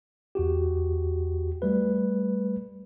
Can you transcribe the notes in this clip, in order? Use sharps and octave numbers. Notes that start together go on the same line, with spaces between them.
E2 F#4 G4
G3 A3 B4